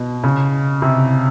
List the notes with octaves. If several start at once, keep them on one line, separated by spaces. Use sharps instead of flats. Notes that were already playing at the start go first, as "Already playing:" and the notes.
Already playing: B2
C#3
C3